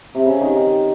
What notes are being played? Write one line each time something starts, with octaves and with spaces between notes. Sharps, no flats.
C3
C#3
D#3
D#3